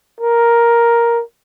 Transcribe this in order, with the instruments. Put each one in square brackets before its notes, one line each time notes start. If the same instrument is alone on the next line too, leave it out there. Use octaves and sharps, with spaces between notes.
[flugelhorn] A#4